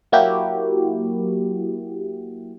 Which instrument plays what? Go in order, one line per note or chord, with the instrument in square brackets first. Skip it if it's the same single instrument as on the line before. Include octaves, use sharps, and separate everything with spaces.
[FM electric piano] F#3 A#3 E4 F#4 G4